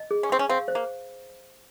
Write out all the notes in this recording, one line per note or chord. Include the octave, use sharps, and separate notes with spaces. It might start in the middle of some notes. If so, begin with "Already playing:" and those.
Already playing: D#5
G#4
C#4
C4 C#6
C#4
C4 F5
C5
A#3